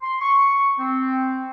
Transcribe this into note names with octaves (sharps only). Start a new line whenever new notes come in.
C6
C#6
C4